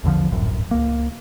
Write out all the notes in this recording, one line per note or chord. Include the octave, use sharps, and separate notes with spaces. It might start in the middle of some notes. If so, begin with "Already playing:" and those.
A#1 E2 D3 F3
D1 G#1 F#2 A2
C#2 A#3